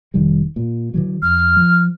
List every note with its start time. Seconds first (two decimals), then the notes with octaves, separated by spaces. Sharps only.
0.14 F1 D#3 G3
0.56 A#2
0.94 D3 E3 F#3
1.22 F2 F6
1.56 F3